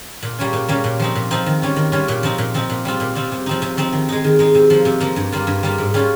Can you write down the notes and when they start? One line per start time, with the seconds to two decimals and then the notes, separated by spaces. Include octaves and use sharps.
0.23 A#2
0.39 G3 A#3 C#4
0.53 A#2
0.68 G3 A#3 C#4
0.84 A#2
1.00 F3 C4 D#4
1.15 A#2
1.31 F3 C4 D#4
1.46 D#3
1.62 G3 C#4 F4
1.76 D#3
1.92 G3 C#4 F4
2.08 A#2
2.23 F3 C4 D#4
2.38 A#2
2.54 F3 C4 D#4
2.70 A#2
2.85 G3 C4 F4
3.00 A#2
3.15 G3 C4 F4
3.32 C3
3.46 F3 C4 D#4
3.62 C3
3.77 F3 C4 D#4
3.93 D#3
4.09 G#3 D#4
4.24 D#3
4.39 G#3 D#4
4.55 C3
4.70 F3 A#3
4.85 C3
5.00 F3 A#3
5.16 G2
5.32 G3 A#3 F4
5.47 G2
5.63 G3 A#3 F4
5.78 G#2
5.94 G3 C#4 F4